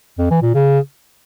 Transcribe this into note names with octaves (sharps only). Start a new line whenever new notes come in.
F2
E3
A#2
C#3